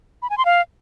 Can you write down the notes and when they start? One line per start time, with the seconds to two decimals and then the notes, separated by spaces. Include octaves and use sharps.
0.22 B5
0.30 G#5
0.38 C6
0.45 F5